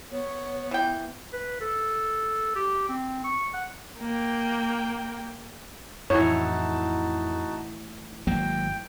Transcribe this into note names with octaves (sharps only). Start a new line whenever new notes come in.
B3 C#5
E3 G5
B4
A4
G4
C4
C#6
F#5
A#3 G5
F2 A2 E3 D#4 F#4 C#5 A5
G#1 F#3 A#3 G5